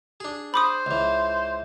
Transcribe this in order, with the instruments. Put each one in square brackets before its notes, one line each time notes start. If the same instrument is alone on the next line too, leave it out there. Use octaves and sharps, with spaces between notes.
[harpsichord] D4 G#4
[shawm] C5 [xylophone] B5 D6 D#6
[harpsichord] C#2 E3